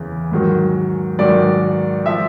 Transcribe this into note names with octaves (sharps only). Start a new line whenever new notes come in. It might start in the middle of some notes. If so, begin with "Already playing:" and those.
Already playing: E2 C#3 E3
G#2 D#3 F#3
G#2 D#3 F#3 D5
F3 E5